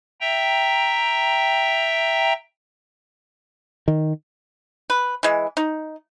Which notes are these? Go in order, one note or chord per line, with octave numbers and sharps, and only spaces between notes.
E5 G5 A#5
D#3
B4
E3 G#3
D#4